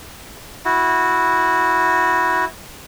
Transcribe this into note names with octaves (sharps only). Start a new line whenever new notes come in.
E4 F#4